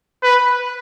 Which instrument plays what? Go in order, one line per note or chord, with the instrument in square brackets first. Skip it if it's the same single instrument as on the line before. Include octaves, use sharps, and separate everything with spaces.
[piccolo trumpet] B4